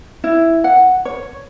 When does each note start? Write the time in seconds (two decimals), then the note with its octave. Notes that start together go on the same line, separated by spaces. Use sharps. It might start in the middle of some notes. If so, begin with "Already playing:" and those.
0.24 E4
0.64 F#5
1.05 C#5